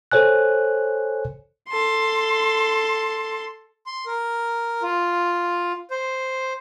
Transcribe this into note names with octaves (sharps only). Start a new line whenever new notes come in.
A4 C5 C#5 G#5 F#6
A4 C6
C6
A#4
F4
C5